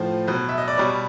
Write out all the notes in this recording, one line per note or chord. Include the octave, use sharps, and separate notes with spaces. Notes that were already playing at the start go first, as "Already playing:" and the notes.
Already playing: A2 F3 C5
B2 F#3
E5
D#5
D5
B2 G3 C#5